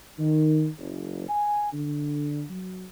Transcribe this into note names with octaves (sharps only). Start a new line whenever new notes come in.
D#3
F#1
G#5
D3
F#3